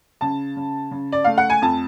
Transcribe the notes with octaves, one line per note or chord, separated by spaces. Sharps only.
C#3 A5
C#3
C#3
D5
A3 F5
F#5
G#5
F2 A5